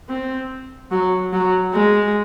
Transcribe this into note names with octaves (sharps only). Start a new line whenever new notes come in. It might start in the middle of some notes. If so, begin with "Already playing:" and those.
C4
F#3
F#3
G#3